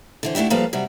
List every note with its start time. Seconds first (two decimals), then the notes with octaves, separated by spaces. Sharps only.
0.23 D3 E3 C5
0.35 D3 A3 D4 E4 G4
0.50 F3 G3 A#3 A4 B4 F5
0.73 C3 F#3 G3